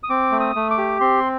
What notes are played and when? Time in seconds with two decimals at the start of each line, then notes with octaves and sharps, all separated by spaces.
0.03 D#6
0.09 C4 D6
0.32 A3
0.40 D#6
0.56 A3
0.71 D6
0.78 G4
1.00 C4 C6